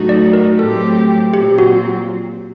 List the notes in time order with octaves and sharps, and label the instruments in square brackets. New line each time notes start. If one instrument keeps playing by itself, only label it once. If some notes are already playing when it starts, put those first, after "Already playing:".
Already playing: [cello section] A2 F#3 A3 D#4 F#4
[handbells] D5
A#4
[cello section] A2 F#3 A3 C4 G4 [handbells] A4
[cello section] A#2 F#3 C4 [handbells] G4
[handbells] F#4